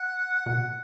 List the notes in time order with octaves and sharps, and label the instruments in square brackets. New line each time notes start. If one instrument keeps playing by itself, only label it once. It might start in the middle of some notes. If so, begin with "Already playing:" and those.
Already playing: [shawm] F#5
[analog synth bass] B2 [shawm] F#5